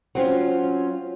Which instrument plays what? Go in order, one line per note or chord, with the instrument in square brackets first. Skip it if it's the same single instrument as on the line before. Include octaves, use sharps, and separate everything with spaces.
[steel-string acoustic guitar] F#3 C4 C#4 F4